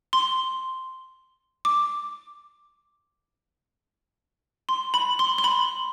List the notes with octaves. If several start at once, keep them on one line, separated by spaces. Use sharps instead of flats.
C6
D6
C6
B5
C6
C6
B5